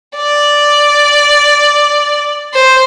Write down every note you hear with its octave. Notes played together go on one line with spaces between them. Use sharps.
D5
C5